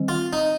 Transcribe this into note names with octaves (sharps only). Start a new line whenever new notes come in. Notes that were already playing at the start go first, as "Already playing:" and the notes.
Already playing: D#3 G3 C4
F4
D#4